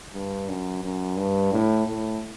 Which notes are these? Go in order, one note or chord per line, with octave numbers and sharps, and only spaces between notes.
G2
F#2
F#2
G2
A2
A2